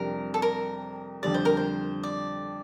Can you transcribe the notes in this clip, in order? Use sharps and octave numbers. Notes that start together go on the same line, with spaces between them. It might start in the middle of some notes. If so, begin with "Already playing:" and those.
Already playing: F2 C3 G3 D4 A#4
A4
A#4
F2 D3 G3 D5
C5
A#4
C5
D5